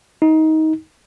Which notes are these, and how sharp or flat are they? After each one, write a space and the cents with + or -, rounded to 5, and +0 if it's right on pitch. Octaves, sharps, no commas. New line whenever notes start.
D#4 +20